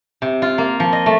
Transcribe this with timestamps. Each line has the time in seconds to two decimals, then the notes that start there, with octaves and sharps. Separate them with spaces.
0.22 C3
0.42 F4
0.58 A#3
0.80 F3
0.92 D#5
1.06 A3